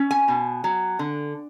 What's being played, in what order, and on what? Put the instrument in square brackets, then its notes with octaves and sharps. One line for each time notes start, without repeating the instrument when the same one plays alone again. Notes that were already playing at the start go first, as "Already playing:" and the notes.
Already playing: [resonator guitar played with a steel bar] C#4
G#5
B2
F#3
D3